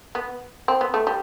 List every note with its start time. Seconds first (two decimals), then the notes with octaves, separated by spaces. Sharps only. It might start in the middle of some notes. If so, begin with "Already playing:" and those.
0.15 B3
0.68 C4
0.81 B3
0.94 A3
1.07 G3